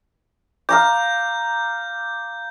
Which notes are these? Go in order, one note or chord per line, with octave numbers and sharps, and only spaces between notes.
F5 A#5 D6 G6